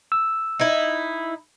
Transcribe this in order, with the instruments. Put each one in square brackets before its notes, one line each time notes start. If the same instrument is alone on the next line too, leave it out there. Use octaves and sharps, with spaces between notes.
[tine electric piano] E6
[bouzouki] D#4 E4